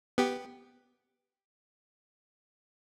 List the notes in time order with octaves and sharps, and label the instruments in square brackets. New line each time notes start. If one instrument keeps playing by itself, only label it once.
[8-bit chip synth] B3 G4